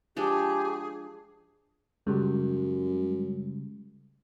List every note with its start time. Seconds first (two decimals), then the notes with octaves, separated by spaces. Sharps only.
0.17 F3 G#3 D4 G4 G#4
2.07 F#2 C#3 G3 G#3